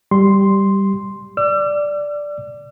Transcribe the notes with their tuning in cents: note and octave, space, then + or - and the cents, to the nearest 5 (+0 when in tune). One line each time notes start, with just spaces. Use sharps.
G3 +0 C6 +0
D5 +0 E6 +45